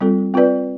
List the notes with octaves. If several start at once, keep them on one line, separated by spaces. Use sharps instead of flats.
G3 C4 F4 A4
C4 F4 B4 D5